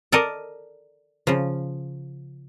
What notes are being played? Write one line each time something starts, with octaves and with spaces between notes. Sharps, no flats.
A4 A#4 D5 D#5
C#3 F3